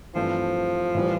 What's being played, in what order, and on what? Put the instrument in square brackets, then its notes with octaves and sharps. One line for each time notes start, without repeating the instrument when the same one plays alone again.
[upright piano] G2 E3 A3 C4 [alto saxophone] F3
[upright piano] A2 E3 G3